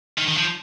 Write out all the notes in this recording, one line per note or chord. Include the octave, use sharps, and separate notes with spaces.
D#3
D#3
F3